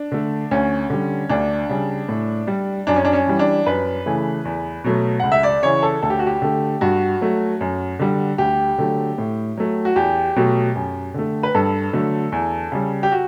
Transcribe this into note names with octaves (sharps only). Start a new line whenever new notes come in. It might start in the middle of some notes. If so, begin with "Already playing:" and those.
Already playing: D4
D3 A3
D2 C#4
D3 G3
D2 D4
C#3 G3
A2
G3
F#2 D4
C#4
D4
C#4
E3 G3
D4
F#2 B4
C#3 E3 A3
E2
B2 F#3 A3
C#2 F#5
E5
D5
C#3 E3 C#5
A4
D2 A4
G4
F#4
G4
D3 A3
G2 F#4
F#3 A3
F#2
D3 G3
D2 G4
D3 F#3 A3
A2
F#3 A3
F#4
E2 G4
B2 F#3 A3
F#2
D3 A3
B4
G2 A4
D3 F#3 A3
E2
C#3 G3
G4
F#4